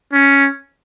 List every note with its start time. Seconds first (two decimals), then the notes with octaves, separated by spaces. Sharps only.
0.13 C#4